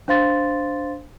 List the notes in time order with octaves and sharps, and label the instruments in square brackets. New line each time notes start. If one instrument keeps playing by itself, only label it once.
[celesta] D4 C5 F5 C6 A6